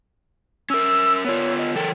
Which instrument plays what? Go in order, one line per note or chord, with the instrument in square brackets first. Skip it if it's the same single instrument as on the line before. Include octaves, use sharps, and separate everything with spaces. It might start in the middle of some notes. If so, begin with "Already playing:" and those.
[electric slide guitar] C#4 A#4 [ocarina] E6
[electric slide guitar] B3 F4 [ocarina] C#5
[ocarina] D#5
[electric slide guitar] E3 A4 A#4 [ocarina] G5